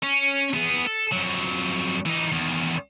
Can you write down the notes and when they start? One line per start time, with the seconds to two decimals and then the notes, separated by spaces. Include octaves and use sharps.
0.03 C#4
0.54 B3 G#4
0.87 A4
1.12 F2 F#3
2.06 E3 D#4
2.32 E2 D#3